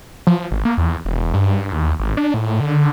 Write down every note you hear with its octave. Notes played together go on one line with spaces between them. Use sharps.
F3
G#1
A#3
E2
E1
G2
D#2
G#1
D4
A2
D3